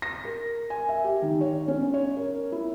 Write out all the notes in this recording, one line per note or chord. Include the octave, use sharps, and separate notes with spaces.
A#6
A#4
G#5
E5
G4
D#3
C#5
C#4
C#5
A#4
E4